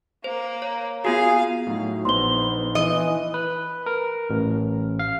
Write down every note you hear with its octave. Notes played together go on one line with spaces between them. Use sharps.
A#3 C5
C#5
B3 F4 F#4 G#4 F5
A2 F#3 D#4
A#1 B3 D#4 C5 C6 G7
E3 D#5
B4
A#4
A1
F5